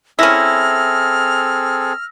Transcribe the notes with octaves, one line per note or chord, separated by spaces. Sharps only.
C4 C#4 E4 G#4 A4 E6 F6 A#6